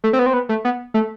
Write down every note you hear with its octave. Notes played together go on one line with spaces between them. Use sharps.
A3
C4
B3
C4
B3
A3
B3
A3